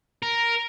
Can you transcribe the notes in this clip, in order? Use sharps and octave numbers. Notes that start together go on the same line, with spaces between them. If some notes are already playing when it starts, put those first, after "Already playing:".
A#4